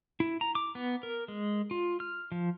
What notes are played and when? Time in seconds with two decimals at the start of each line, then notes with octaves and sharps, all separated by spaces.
0.20 E4
0.41 A#5
0.55 D6
0.75 B3
1.03 A#4
1.28 G#3
1.71 F4
2.00 F6
2.32 F3